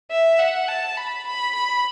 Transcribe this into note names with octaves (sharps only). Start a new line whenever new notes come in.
E5
F#5
A5
B5
B5
B5